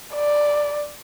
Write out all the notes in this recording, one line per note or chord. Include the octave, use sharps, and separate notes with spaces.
D5